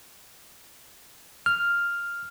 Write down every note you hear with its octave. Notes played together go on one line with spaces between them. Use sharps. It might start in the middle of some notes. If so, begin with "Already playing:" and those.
F6